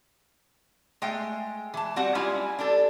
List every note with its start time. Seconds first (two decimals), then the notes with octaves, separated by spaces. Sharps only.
1.02 G#3 A3 G5
1.74 E3 A5
1.96 G3 C4 F#4 F#5
2.15 G3 G#3 C#4 E4 F4
2.59 D4 G4 A4